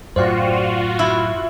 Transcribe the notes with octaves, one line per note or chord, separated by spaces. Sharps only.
F#2 A2 F4 F#4 C5 D5 G5
E4 B5